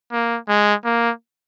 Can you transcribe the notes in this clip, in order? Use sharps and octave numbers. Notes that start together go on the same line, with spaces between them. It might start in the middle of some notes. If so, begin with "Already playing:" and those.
A#3
G#3
A#3